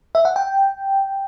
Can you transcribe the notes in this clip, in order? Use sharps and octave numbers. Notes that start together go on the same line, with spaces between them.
E5
F#5
G5